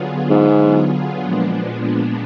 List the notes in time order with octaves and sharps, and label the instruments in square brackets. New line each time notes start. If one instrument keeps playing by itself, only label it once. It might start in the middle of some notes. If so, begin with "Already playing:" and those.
Already playing: [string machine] D3 F#3 B3 F4 G#4
[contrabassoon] G#2
[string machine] A#2 F3 G#3 B3 D4